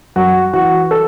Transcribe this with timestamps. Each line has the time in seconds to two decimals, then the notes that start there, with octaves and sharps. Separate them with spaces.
0.16 F#2 F#4
0.53 E3 F#4
0.91 A4